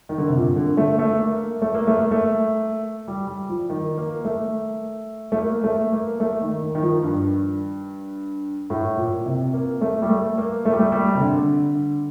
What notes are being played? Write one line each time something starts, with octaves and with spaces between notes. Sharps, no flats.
D#3
D3
C3
A#2
D3
A3
A3
A#3
A3
A#3
A3
A#3
A3
G3
G3
F3
D#3
A#3
A3
A3
A#3
A3
A#3
A3
D#3
D#3
D#3
F3
G2
A2
A#2
C3
A#3
A3
G3
A3
A#3
A3
G3
A3
G3
C3
D3